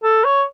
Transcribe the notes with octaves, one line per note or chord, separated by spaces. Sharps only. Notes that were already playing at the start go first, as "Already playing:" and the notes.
A4
C#5